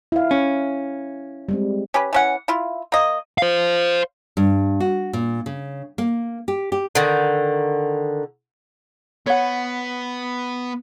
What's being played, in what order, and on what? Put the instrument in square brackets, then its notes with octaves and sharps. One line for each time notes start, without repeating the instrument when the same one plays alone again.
[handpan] E4 F5
[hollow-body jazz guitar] C#4 [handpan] E4
[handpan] G3 G#3 C4
[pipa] C#4 G4 B4
E3 C#4 F#5
E4 F4
A#3 D#5
[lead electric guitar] C5 F5
[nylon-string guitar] G2
F#4
A#2
C#3
A#3
G4
G4
[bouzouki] D3 D#3
[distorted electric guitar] B3 [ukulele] C#5 F#5